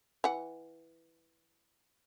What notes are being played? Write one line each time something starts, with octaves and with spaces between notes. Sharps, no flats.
E3 F#5